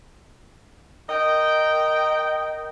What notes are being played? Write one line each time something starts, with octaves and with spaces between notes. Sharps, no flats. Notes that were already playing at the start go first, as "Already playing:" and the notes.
A#4 D#5 G5